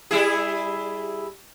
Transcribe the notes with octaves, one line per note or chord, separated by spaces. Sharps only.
G3 E4 G#4